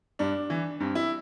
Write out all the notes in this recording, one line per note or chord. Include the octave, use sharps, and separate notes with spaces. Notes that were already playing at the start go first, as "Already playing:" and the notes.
G2 D4
E3
G2 C4
E4